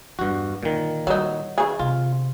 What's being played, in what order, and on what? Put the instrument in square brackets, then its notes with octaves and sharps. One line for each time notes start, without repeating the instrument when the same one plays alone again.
[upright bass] E2 [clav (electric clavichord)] G2 F#4
[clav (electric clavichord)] A#2 D#3 [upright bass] D3
[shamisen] F#3 D#4 [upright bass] G3
[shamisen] D#3 G#4
[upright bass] C3 [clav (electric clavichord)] F4